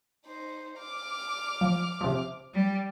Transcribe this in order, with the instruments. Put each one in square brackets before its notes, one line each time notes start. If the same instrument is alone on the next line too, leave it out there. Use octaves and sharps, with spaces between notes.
[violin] D#4 C5
D6 F6
[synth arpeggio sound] F3
C3 F3
[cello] G3